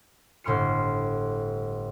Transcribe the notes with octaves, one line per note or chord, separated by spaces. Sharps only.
G1 A2 C6 F6 C#7